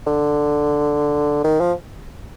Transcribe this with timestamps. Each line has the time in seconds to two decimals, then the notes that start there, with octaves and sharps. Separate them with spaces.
0.07 D3
1.44 D#3
1.61 F3